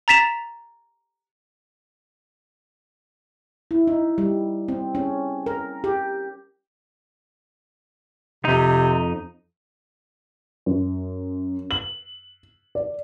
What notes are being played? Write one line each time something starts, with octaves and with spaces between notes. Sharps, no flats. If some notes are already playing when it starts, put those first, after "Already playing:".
A#5 A6 B6 E7 F7
E4
D#4
G3
C4
C#4
A#4
G4
F2 C3 D#4
F#2
F#7
D5